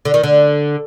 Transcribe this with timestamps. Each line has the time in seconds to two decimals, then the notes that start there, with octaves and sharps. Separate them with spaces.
0.05 D3
0.14 D#3
0.23 D3